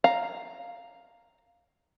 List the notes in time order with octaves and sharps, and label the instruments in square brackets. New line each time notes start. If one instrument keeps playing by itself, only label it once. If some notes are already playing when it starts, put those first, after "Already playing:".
[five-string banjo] F5 A#5